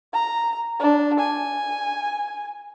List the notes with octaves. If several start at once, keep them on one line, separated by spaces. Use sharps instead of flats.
A#5
D4
G#5